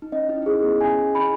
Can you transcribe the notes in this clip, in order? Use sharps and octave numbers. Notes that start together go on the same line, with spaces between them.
D#4
C#4 D#5
E4
D#4
C#4 G#4
B3
C#4 G#5
E4 B5